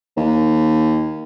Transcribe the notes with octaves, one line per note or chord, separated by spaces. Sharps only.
D#2